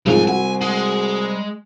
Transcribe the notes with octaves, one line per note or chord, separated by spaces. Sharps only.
B1 G#2 F3 G3 G#3 C4 G#5
F#4 G#5
G#3